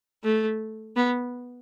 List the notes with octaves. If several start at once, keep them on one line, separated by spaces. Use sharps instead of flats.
A3
B3